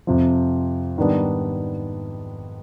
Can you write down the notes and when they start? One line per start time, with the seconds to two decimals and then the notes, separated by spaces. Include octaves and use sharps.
0.07 F2 C3 F3
0.97 G#2 D#3 G3 B3 D4